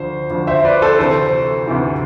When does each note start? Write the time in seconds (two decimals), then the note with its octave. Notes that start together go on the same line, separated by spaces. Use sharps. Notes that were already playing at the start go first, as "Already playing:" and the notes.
Already playing: D2 D3 F3 C5
0.31 D2 D3 F3
0.47 C5 E5
0.65 B4 D5
0.82 A4 C5
0.99 D2 C3 E3 A4 C5
1.67 D2 C3 E3